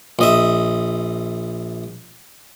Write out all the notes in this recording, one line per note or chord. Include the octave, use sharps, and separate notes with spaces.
A#1 D#5 E5